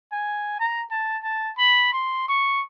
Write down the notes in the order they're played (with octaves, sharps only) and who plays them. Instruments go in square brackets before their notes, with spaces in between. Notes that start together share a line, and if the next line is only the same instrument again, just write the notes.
[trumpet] G#5
A#5
A5
A5
B5
C6
C#6